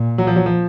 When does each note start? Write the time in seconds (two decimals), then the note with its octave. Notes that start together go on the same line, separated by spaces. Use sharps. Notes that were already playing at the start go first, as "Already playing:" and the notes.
Already playing: A#2
0.18 F#3
0.27 F3
0.36 F#3
0.46 F3